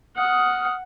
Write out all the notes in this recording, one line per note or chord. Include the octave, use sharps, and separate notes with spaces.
F#5 D#6 F6